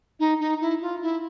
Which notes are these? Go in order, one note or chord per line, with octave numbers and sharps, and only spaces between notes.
D#4
D#4
E4
F4
E4